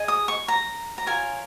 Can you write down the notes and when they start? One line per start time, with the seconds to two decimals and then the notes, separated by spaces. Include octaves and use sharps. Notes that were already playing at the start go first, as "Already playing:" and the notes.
Already playing: G#4 D#5
0.08 D#6
0.28 C#6
0.48 A#5
0.98 A#5
1.06 F4 A#4 C#5 G#5